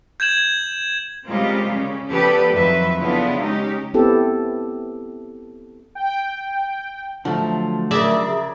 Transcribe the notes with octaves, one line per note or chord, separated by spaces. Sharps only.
G6 G#6 E7 F#7
C#3 G3 G#3 A#3 C4 F4
C#3 C#4
F3 B3 G4 A4 B4 D5
F2 D#3 F#3 B4 E5
C#3 B3 D4 E4 F4 A4
G#3 C#4 D#4 G4
B3 C4 E4 G4 A4
G5
D3 F3 F#3 A3
C#3 G#4 A#4 D5 E5